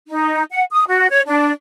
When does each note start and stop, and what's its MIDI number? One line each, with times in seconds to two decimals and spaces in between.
0.07 0.43 63
0.51 0.63 78
0.71 0.84 87
0.88 1.07 66
1.11 1.20 73
1.26 1.51 62